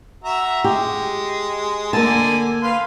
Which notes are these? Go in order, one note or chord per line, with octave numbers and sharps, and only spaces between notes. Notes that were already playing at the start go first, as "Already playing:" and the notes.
F#4 E5 A#5
G#3 G4
D3 A#3 G#5 A5
B4 F5 C6